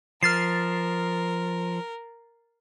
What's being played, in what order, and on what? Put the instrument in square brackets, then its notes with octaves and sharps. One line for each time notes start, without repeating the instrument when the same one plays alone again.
[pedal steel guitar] F3 [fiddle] A#4 [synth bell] F6 A6 C7